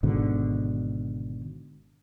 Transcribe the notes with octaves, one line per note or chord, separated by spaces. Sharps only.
G#1 G#2 B2 D3